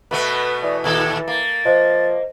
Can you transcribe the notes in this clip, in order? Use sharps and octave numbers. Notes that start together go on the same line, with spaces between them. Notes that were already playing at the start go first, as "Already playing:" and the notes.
B2 A3 B3 B4
E3 D5
D#2 A#2 A4 G#6
A#3 A6
F3 C5 D#5